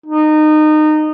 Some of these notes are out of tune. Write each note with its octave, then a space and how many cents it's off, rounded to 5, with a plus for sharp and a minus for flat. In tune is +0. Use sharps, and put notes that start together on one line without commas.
D#4 -25